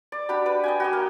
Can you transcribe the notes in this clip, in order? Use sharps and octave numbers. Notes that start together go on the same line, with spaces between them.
D5
D4 F#4 G4 B5
B4 D5 B5
D#5 G5 G#5
F#4 G4 D#5
A#3